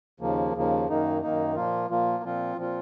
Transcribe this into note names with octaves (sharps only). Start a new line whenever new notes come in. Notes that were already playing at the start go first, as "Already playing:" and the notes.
D#2 C#3 F3 A#3
D#2 C#3 F3 A#3
F#2 D#3 A#3 D#4
F#2 D#3 A#3 D#4
A#2 F3 A#3 F4
A#2 F3 A#3 F4
A#2 F3 C4 F4
A#2 F3 C4 F4